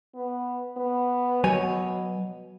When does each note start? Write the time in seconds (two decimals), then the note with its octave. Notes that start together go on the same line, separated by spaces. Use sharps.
0.15 B3
0.77 B3
1.44 B2 F#3 C#5 G#5